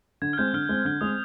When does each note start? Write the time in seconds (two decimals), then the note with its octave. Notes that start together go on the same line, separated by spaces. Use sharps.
0.22 D3 G#6
0.33 F6
0.38 G#3 C4 G6
0.54 D3 F6
0.69 G#3 C4
0.85 D3 F6
1.01 G#3 C4 D#6